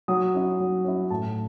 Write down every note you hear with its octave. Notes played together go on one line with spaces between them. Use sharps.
F#3 D#6
C#4 E4
F#3
C#4 E4
A2 A5